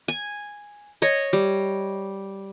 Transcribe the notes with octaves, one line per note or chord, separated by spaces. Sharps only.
G#5
C#5 D#5
G3